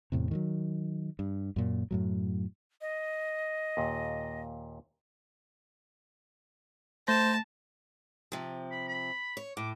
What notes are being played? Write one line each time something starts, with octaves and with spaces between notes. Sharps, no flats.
E2 A2 C3
D#3 E3 F#3
G2
F#2 A#2
F#2 A2 F#3
D#5
D#2 A#2
A3 C5 A5 A#6
C3 F3
B5
B5
C#5
A2 D6